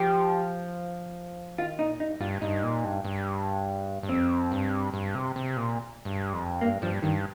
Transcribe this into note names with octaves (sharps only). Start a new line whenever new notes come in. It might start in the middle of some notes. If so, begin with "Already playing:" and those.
Already playing: F3 G4
D#3 F4
A#2 D#4
G2 D#4
G2 F4
G2 D#4
A#2
G2
G2
G2
F2 C4
G2
G2
C3
C3
A#2
G2
F2
G2 A#3
G2 F3
G2 D#3